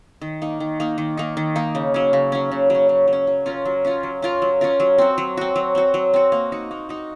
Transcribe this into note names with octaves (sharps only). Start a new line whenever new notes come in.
D#3
A#3 D#4
D#3
A#3 D#4
D#3
A#3 D#4
D#3
A#3 D#4
C#3
F#3 C#4
C#3
F#3 C#4
C#3
F#3 C#4
C#3
F#3
C#4
F#3
C#4 F4 A#4
F#3
C#4 F4 A#4
F#3
C#4 F4 A#4
F#3
C#4 F4 A#4
F#3
C4 F#4
F#3
C4 F#4
F#3
C4 F#4
F#3
C4 F#4
A#3
D#4 F#4
A#3
D#4 F#4